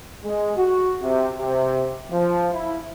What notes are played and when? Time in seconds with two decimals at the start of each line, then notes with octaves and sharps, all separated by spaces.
0.24 G#3
0.57 F#4
1.02 C3
1.39 C3
2.11 F3
2.53 E4